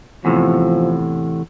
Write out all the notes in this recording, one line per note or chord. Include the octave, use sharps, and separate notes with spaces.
E2 A2 C3 F3